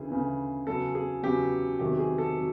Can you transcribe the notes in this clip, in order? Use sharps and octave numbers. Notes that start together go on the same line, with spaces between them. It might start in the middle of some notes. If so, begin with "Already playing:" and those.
Already playing: D2 C#3 E3 G#4
D2 C#3 E3
E2 C#3 F#3 A4
G#4
E2 C#3 F#3 G4
E2 C3 D#3 F#3 G4
G#4
A4
F#3